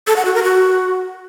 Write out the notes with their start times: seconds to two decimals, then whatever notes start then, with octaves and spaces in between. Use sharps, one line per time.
0.07 A4
0.16 F#5
0.25 F#4
0.34 A#4
0.43 F#4